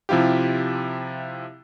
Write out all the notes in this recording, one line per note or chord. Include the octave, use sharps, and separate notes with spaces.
C3 F3 E4 F4 G4